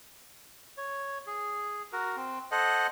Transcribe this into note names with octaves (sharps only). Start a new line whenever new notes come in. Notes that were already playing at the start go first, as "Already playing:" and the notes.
C#5
G#4
F#4 A#4
C4
A4 C5 D#5 F#5